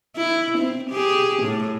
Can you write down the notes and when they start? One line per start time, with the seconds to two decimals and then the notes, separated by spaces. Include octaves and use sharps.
0.17 E4
0.58 C4
0.90 G4 G#4
1.43 A2